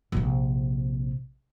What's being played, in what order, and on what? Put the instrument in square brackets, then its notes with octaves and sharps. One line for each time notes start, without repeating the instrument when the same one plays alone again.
[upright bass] A#1 C3